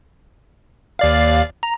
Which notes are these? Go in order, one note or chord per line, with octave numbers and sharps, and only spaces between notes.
D#2 D5 F5
A#5